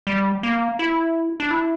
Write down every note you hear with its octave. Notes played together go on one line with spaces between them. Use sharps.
G3
A#3
E4
D4
E4